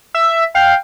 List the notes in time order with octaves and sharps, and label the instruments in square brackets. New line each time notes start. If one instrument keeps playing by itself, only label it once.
[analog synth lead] E5
[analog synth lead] F5 [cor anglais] G5